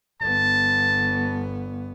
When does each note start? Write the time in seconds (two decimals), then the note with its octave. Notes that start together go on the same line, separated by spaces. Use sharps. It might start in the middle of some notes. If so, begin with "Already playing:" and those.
0.21 G1 B3 A5